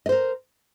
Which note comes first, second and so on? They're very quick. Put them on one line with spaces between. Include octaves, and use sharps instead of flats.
D#5 C5 A#4